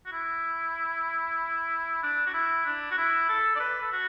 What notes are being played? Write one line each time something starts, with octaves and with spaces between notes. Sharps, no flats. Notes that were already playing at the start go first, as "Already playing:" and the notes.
F#4
E4
D4
F#4
E4
D4
F#4
E4
A4
D5
B4
A4
F#4